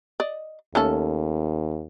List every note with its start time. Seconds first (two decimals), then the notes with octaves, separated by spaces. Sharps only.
0.20 D5 D#5
0.75 D#2 A3 C#4 A4